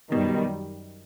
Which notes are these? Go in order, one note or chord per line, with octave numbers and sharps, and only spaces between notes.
F#2 B2 D#3 G3